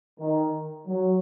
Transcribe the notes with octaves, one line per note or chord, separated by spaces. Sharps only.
D#3
F#3